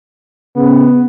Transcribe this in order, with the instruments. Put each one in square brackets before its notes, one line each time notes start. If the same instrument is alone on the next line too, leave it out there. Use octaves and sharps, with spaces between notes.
[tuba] C#3 [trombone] B3